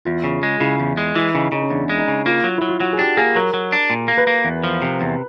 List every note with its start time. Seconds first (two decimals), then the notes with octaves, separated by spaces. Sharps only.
0.05 E2 F4
0.24 C#3
0.43 G#3
0.60 C#3 E4
0.80 E2
0.97 G#3
1.16 E3 E4
1.34 C#3 D#4
1.52 C#3 D#4
1.62 C#4
1.70 E2 D4
1.89 G#3
1.98 D#4
2.08 C#3
2.26 A#3 F4
2.44 F#3
2.58 F#3 E4
2.69 F4
2.80 F#3 F#4
2.93 G#4
2.99 D4 G4
3.17 A#3 G#4
3.36 F#3 A#4
3.54 F#3
3.72 D4
3.90 A#2
4.08 A#3
4.18 B4
4.27 A#3
4.45 E2
4.64 F3
4.82 C3
5.01 E2